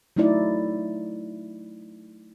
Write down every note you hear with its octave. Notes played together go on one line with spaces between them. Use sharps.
F#3 A3 D#4 E4 D5